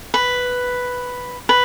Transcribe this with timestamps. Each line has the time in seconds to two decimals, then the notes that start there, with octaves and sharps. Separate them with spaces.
0.14 B4
1.49 B4